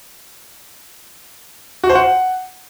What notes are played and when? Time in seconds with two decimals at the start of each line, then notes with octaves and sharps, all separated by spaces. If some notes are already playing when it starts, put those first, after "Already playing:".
1.83 F#4
1.89 C5
1.95 F#5